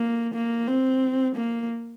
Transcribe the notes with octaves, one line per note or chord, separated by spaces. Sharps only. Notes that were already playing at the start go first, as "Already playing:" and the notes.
Already playing: A#3
A#3
C4
A#3